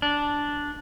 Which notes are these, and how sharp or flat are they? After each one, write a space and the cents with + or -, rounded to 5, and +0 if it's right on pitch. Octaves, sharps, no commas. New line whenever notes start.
D4 -5